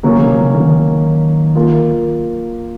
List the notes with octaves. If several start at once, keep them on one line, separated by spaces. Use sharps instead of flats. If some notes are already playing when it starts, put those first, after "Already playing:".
C#3 F#3 A#3 C#4
C#3
C3
C#3
C#3
D#3
A#3 F4 A#4